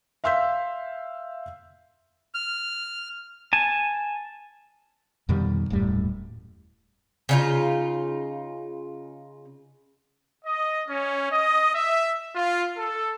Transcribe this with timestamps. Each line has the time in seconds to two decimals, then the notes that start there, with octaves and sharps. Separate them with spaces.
0.24 E5 F5 C6 E6 G6 B6
2.34 F6
3.53 G#5 A5
5.29 F2 B2 D#3 G3
5.70 D#1 F#2 A2 G3
7.29 C#3 D#4 F4
10.45 D#5
10.88 C#4
11.31 D#5
11.74 E5
12.36 F4
12.78 A4